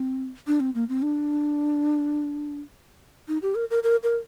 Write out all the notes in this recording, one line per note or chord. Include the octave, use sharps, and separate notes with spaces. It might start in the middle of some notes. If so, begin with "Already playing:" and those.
Already playing: C4
D4
C4
A#3
C4
D4
D#4
G4
A#4
A#4
A#4
A#4